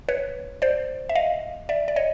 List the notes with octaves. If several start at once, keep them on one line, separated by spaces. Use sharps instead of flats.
B4 C#5
C5 D5
E5
D#5 F5
D5 E5
D5
C#5 D#5